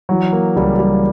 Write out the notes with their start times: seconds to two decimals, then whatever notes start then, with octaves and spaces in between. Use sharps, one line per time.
0.09 E3 F#3
0.32 A#3
0.56 C#2 G3
0.79 G3